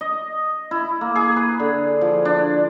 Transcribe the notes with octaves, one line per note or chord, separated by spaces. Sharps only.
D#5
E4
A#3
G#4
B4
D3
F3
D4